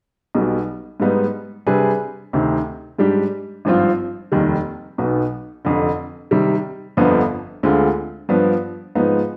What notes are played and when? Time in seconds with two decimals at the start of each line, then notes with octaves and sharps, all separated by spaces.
0.35 B1 B2 G3
1.00 G#2 G3 B3 D#4
1.67 C3 G3 D4 G#4 B4
2.33 D2 C3 D#3
2.99 G#2 G3 D4 G4
3.65 G#1 G2 F3 C4 F4
4.32 F1 D#2 D#3 G3
4.98 B1 B2 B3 D#4
5.65 F1 F2 D3
6.31 C3 D#3 G3
6.97 G1 F2 D3 F3 B3
7.63 D2 D3 G#3 C4 F4
8.29 G2 F3 B3 D4
8.95 G#2 F3 B3 D#4